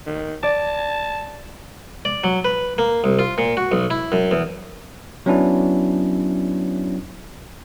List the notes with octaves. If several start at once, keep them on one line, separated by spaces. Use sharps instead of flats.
D#3
D5 A5
D5
F#3
B4
A#3
C2
F4
A#2
F#4
B1
E4
F#2
E2
F#3 B3 C#4 D4 E4